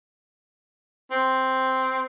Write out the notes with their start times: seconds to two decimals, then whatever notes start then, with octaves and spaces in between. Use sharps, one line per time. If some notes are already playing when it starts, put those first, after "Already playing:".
1.11 C4